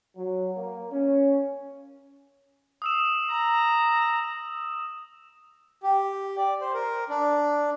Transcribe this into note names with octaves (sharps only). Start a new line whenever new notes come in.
F#3
A#3
C#4
D#6 E6 E7
A#5
G4
D5
C5
A#4
D4